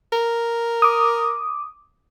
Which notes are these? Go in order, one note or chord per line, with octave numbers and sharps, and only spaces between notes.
A#4
D6 D#6